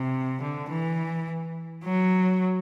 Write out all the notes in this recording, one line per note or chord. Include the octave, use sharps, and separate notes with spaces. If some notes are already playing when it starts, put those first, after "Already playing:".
Already playing: C3
D3
E3
F#3